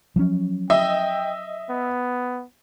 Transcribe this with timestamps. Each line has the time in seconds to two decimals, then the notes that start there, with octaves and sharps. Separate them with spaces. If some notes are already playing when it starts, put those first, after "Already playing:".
0.16 F3 F#3 C#4
0.70 D#5 E5 G5
1.70 B3